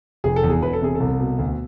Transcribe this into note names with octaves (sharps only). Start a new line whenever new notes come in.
F1 G#4
A4
E2
G#4
E1 B4
A4
C3 G#4
A4
C2
B2
D2